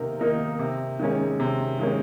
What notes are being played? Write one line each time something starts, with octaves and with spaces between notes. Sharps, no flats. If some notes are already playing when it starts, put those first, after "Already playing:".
Already playing: C3 D#3 A#3 D#4 A#4
D#3 A#3 D#4 A#4
C3
D#3 G#3 C#4
C3
D#3 G#3 C#4